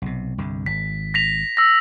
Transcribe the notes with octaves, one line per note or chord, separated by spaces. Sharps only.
B1 C3
C2 G2 D3
G#1 B6
A#6 B6 F7
E6 A#6